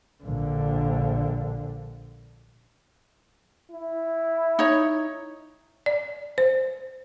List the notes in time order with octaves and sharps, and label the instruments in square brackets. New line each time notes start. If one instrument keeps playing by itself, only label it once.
[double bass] A#1 D3
[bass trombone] E4
[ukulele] D#4 C#5
[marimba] D5
C5